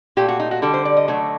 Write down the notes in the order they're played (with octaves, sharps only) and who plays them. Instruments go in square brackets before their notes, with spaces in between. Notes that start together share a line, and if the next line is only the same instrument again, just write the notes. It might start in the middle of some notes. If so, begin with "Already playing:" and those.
[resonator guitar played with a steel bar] A#2 A3 G4
F#4
D#4
F#4
D3 G3 A4
C5
D5
D#5
D3 F#3 A3